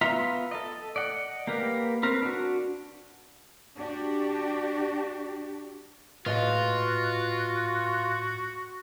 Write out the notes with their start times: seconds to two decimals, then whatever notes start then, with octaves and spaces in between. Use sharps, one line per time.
0.01 B3 F4 E5 A#5
0.51 A4 D#5
0.96 D5 D#5 F#5
1.47 A#3 G4 A#4 B4
2.03 C4 A#4 B4
2.22 D4 F#4
3.76 D4 F#4 G4
6.26 A2 F4 F#4 B4 D#5 F5